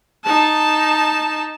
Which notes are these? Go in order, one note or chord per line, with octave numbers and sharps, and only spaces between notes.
D#4 A5